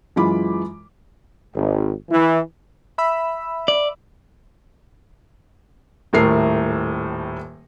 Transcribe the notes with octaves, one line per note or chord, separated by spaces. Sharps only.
F#2 E3 G#3 F4 B5 D6
G#1
E3
E5 B5 E6
D5
D#1 A2 A3 A#4 C7